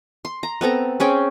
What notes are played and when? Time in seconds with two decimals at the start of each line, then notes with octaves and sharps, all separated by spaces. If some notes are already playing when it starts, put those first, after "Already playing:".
0.25 C6
0.43 A#5
0.61 B3 C4 A4 A#5
1.00 C4 C#4 G#4 G5